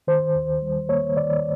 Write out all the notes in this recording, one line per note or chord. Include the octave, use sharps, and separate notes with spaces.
D#3 C5
D#2
G3
A#3 C#5
D#3 D5